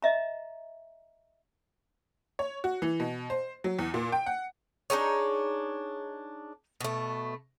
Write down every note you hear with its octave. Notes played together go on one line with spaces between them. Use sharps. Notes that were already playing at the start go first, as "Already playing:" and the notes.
D#5 E5 A#5
C#5
F#4
E3
B2
C5
F#3
E2
A#2
G5
F#5
D4 D#4 G#4 C#5
B2 A3